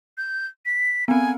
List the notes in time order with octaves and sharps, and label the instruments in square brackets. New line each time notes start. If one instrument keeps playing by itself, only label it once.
[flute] G6
B6
[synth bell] B3 C4 [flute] G#5